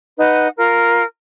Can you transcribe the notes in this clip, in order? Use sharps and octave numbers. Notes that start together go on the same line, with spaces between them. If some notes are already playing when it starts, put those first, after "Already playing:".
D#4 B4 F#5
F4 A#4